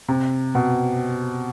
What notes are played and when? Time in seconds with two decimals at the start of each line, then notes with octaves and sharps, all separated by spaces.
0.09 C3
0.55 B2